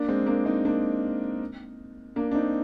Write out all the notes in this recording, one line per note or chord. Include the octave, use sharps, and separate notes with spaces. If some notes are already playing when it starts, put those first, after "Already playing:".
Already playing: A#3 D4
G#3 C4
A#3 D4
C4 D#4
A#3 D4
A#3 D4
D4
C4 D#4